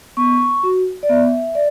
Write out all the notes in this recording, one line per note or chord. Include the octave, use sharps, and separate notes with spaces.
B3 C#6
F#4
D5
B3 E5
D5